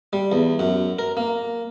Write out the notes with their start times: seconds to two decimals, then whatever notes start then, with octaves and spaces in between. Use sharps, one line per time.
0.13 G3
0.32 E2
0.59 F#2
0.99 A#4
1.17 A#3